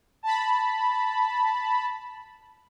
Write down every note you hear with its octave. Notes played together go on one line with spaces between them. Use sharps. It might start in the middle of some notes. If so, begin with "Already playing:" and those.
A5 B5